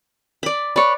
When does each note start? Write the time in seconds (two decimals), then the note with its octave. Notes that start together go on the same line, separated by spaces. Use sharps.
0.43 D5 B5
0.76 B4 C#5 D5